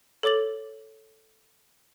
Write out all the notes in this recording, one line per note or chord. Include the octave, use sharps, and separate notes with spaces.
A4 C#5 D6 A6 F#7